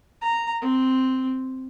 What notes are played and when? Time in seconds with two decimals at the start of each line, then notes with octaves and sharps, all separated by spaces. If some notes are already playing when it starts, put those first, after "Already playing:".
0.22 A#5
0.61 C4